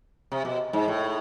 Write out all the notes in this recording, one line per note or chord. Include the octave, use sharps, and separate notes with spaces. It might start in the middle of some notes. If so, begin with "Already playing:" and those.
C3
B2
G#2
A2